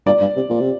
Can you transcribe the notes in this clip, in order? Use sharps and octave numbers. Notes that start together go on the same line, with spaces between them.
G2 D5
G2
C3
A#2
C3